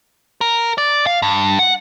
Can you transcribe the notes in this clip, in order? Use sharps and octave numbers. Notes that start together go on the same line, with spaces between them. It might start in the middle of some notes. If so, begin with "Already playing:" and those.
A#4
D5
F5
G2
F#5